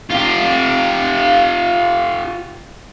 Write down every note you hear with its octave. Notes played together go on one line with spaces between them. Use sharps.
F4 G4